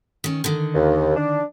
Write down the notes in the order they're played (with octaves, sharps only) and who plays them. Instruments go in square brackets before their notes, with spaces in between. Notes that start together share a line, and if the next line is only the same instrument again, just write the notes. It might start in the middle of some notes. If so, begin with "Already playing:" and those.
[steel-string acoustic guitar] D#3 C#4
D3 D#3
[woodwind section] D#2
D4